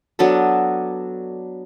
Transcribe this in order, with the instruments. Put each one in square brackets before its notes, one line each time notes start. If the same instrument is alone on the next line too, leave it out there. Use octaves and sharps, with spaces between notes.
[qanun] F#3 B3 D4 A4